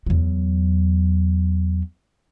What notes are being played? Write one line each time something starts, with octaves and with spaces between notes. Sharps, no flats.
E2 F#3